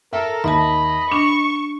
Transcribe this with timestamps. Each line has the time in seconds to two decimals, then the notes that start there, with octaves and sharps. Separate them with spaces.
0.13 A4 A#4 E5
0.44 D#2 D#5 E5 A5 B5
1.12 D4 C#6 E7